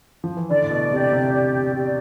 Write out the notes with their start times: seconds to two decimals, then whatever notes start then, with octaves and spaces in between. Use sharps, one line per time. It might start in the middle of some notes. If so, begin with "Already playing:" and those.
0.24 F3
0.37 E3
0.50 D3 D5
0.62 A2
0.71 B2
0.91 C3 G4
1.12 C3
1.33 D5
1.75 G4